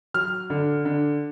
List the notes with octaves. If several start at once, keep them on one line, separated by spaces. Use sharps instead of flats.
F#3 F6
D3
D3